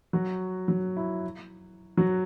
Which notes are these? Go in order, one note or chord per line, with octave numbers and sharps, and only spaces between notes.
F#3 F#4
F#3 F#4
E4
F#3 F#4